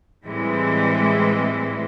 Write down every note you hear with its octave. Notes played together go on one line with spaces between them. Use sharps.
A2 E3 G3 G#3 C4 E4